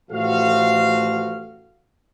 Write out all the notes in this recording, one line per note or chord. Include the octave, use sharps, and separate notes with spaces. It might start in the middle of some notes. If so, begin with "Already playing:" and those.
A1 A2 F3 F#4 A4 F5